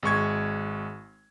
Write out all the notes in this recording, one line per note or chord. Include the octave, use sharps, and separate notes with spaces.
G#1 G#3 C#6 G#6